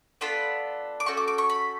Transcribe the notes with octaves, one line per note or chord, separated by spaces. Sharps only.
B3 D4 F4 A4 B5
D6
A3 C#4 F#4 A4 C#6
D6
D6
C#6
B5